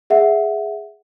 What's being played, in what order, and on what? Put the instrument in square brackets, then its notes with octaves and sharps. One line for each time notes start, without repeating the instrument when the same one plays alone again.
[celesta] G#4 E5 F#5